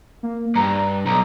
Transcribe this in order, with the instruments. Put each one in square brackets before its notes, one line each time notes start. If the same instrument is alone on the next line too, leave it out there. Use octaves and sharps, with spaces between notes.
[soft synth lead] A#3
[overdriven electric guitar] G2 [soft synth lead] A#5
[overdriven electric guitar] B1 [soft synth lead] A#5